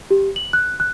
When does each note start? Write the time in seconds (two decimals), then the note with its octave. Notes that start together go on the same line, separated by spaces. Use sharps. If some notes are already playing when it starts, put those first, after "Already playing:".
0.11 G4
0.36 F#7
0.53 F#6
0.80 F#6